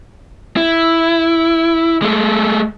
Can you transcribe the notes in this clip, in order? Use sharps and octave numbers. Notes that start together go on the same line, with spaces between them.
E4
G#3 A3